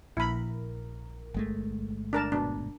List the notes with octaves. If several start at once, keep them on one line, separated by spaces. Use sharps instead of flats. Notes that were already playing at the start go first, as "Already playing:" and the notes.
A#1 E4 A#4 B5
G1 G#3 A3
D4 A#4 A5
A#1 B2 D4